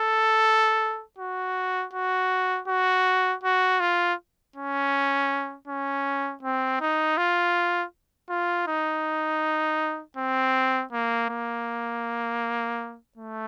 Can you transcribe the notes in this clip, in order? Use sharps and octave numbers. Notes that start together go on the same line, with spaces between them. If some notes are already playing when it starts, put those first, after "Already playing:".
Already playing: A4
F#4
F#4
F#4
F#4
F4
C#4
C#4
C4
D#4
F4
F4
D#4
C4
A#3
A#3
A3